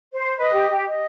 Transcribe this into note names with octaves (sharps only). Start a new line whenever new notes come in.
C5
B4 D#5
G4
G4
D#5